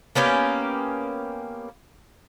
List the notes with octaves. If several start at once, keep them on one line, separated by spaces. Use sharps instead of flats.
A#3 B3 C#4 G4